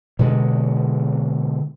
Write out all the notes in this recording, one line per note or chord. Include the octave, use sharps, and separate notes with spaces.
B2 D3 G#3